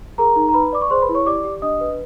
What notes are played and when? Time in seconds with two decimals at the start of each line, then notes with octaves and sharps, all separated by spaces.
0.18 G#4 A#4 A#5
0.36 D#4
0.48 A#5
0.54 B4 B5
0.73 D5 D6
0.82 C#6
0.90 G#4 C5 C6
1.02 B4 B5
1.09 E4
1.15 C#5 C#6
1.26 G4 D5 D6
1.44 G4
1.62 D4 D#5 D#6
1.81 B4